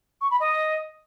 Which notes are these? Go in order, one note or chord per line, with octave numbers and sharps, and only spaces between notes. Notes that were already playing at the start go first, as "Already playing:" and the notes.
C#6
B5
D#5